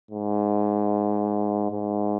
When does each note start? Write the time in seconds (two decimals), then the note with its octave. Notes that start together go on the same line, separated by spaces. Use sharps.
0.11 G#2
1.71 G#2